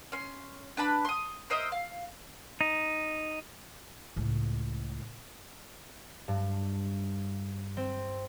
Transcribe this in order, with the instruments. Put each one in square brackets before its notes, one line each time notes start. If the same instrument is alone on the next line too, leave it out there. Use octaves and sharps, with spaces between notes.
[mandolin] C#4 C6
D4 B4 A5 B5
C6 D#6
A#4 C5 D#5 E5
F5
[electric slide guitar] D#4
[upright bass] C#2 A2
[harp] G2
C4